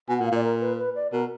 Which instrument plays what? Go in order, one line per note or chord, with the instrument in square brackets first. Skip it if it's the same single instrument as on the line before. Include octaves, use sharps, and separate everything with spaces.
[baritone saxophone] B2 [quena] G#5
[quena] F#5
[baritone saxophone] A#2
[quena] F5
[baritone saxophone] A#2 [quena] D5
[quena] A#4
B4
B4
D5
[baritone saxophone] B2 [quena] A#4